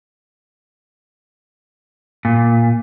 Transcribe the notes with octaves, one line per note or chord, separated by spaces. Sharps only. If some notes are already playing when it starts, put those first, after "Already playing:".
A#2